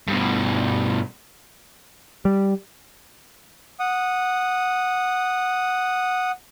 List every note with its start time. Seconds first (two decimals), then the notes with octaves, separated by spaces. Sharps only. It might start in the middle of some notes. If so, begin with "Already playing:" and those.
0.08 G2 B2
2.25 G3
3.80 F#5 D#6